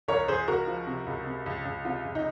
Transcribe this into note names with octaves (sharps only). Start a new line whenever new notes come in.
C#2 A#4 C#5
C#2 G#4 C5
C#2 F#4 A#4
F3
C3
C#2
C3
C#2
C#2
C3 F4
C#2
D#4